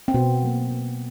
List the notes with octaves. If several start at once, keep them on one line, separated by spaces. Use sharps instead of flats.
C4
B2 B3
F#3 A#3
B2